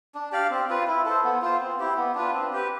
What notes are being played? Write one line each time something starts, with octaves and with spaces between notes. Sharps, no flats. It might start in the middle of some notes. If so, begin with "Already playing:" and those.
D4
G4 D5 F5
C4
F4 B4
E4
A4 C5
B3
F4 C5
C4
E4 G4
B3
D4 F4 B4
C4
G4 B4